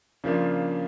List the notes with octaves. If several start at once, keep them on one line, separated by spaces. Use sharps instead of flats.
C#3 F3 A#3 D4 F4